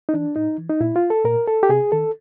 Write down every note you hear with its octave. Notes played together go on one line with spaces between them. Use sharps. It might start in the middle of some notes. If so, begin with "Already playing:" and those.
D#4
E3 D4
A2 D#4
E3
D#4
A#2 E4
F4
A4
A#2 A#4
A4
G4
C3 G#4
D#3 A4